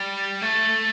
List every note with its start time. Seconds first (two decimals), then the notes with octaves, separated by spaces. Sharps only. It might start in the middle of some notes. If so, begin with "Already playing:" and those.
Already playing: G3
0.42 A3